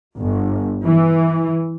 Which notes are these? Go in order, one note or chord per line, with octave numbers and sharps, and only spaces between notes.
G1
E3